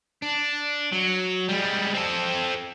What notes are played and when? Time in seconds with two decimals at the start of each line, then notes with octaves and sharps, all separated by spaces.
0.22 D4
0.93 F#3
1.48 G3 G#3
1.94 C4 A4